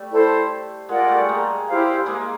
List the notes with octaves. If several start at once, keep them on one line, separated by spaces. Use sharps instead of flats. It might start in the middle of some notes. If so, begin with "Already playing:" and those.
Already playing: G3 A3
E4 A4 C5
G#3 F4 A#4 D5 F#5
G3 A3
G#3 A#3
E4 G4 C5 F5
G#3 A#3